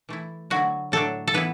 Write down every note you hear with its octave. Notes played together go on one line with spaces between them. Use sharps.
E3 A3 E4
D3 F#3 A3 E4 F#4
A2 F#3 A3 D4 A4
A4
E3 B3 E4 B4